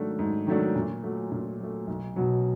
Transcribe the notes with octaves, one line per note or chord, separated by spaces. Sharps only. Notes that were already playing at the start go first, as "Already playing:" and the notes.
Already playing: G#2 D#3 F#3 A3 D4
G#2
D#3 F#3 A3 D4
A#2
F#3 A3
A#2
F#3 A3
B1
B2 F#3